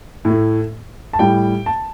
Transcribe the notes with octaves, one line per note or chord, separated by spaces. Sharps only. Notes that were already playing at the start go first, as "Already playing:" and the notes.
A2
A3
A5
A2 G3 G5
A5